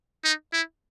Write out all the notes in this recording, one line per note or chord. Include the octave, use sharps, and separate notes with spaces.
D#4
E4